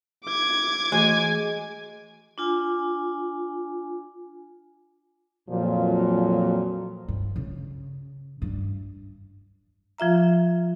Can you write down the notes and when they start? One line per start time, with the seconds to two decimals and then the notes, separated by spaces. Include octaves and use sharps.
0.25 D6 G#6
0.92 E3 G#3 A3 F#4 G#5
2.38 D4 F4 G#5
5.49 F2 A#2 F3 F#3
7.08 G2
7.36 C#3
8.42 G2
9.98 F3 F4 E5 A#5